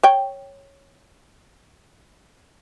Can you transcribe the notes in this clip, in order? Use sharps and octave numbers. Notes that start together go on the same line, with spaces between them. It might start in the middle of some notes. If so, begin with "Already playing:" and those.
C#5 G5